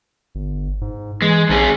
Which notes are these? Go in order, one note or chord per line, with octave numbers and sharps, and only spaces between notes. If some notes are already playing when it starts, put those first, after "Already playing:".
G1
G#2
E3 G#3
A#1 D#3 C4 G#4